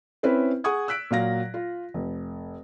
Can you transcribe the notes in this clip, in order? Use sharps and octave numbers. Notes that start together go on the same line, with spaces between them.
C4 C#4 E4 B4 C5
G#4 F#5 G#5 C#6 D#6 G#6
E6 F#6 B6 D7
A#2 F#3 F5 A#6
F4
F1